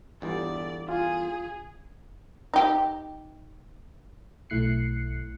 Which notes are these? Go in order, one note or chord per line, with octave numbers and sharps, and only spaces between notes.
G1 E2 D4 G4 D5
F4 G#4
D#4 G4
B1 A3 E4 F#6 C7 C#7